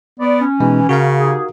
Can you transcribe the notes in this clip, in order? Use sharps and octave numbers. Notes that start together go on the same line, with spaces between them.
B3 D5
C#4
B2 E3 G#3 D#4
C#3 F#4 A#4 F5
D#4 G4 G#4